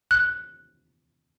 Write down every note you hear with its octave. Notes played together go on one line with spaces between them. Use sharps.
F#6